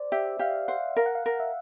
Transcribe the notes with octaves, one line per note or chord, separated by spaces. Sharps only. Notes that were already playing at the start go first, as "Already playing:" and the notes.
Already playing: C5 D5
G4 E5
G4 F5
C5 F#5
A#4 F5
F#5
F5
A#4
E5